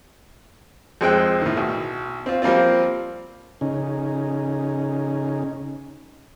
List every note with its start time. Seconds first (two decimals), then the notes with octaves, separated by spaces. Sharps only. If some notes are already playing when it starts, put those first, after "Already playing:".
1.01 F2 G#3 C4 G5 F#6
1.42 A2 D#3
1.57 B1
2.26 C4 F4
2.42 F3 G3 A#3 C4 F4
3.61 C#3 C#4 D#4